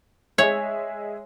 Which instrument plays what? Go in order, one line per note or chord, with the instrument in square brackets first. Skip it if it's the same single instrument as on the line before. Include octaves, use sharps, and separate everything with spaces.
[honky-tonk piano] G#3 G#4 E5 [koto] C#5